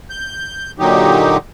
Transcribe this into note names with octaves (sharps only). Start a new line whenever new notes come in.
G6
A#2 D3 F#3 D#4 G4